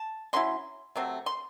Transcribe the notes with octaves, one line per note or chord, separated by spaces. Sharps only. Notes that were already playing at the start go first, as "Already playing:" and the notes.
Already playing: A5
F#3 C#4 E4 C6
C3 F#3 A3 C4
C6